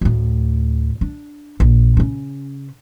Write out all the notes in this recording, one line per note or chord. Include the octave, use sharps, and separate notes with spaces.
D2 A2
D4
A#1
C#3 C#4